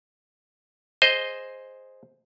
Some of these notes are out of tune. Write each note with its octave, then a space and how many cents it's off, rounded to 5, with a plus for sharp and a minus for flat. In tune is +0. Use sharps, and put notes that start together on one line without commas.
G#4 +0 C5 +0 D#5 +0